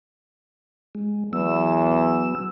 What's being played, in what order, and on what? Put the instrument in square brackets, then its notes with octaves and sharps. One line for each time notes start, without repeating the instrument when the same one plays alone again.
[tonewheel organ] G#3
[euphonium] E2 [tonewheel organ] F#3 B3 E6